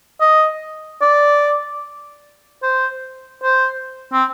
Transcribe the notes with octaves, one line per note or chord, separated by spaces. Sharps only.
D#5
D5
C5
C5
C4